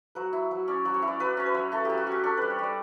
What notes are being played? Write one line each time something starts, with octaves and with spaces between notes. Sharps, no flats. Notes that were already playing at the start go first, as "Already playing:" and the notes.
F#3 B4
E4
F#3
C#4 D5
F#3
C#5
E4
D5
F#3 B4
C#4 C#5
B4
F#3
E4 A4
F#3 G4
F#4
C#4 G4
D4 A4
G3 B4
C#5
G3 D5